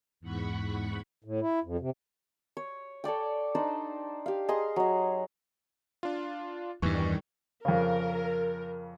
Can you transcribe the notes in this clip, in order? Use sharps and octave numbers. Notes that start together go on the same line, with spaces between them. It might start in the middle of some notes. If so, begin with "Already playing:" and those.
E2 G#2 F#5 B5 C#6
A2
E4
F2
C3
C#5
A4 C#5 D5 G5
D4 D#4 C5 D5
G4 F5
G#4 D#5 A#5 C6
F#3 D#5
D4 F4
E2 G2 D#3 E3 G3 C#6
F2 C#3 A#4